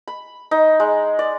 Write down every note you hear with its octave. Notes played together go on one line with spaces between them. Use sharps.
B5
D#4
G#3
D5